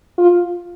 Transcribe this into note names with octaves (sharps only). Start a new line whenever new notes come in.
F4